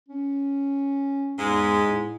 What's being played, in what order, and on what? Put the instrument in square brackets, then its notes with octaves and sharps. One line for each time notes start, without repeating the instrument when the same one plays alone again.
[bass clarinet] C#4
[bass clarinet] E2 [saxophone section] G#2 G#3
[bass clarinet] A2